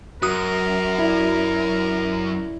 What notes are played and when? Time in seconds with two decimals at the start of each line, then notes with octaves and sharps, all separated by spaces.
0.22 F#2 F#4 A#4 D#6
0.98 E4 D5